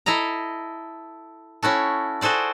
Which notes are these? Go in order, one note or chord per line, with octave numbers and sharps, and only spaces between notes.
E4 A4 D#5 A#5
C#4 E4 F#4 A4
F#4 G#4 A4 C5 D5